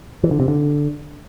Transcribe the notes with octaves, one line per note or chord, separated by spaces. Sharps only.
E3
D3
C3
D3